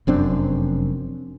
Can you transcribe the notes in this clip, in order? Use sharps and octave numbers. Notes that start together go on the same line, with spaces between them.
F1 F#2 C4 D4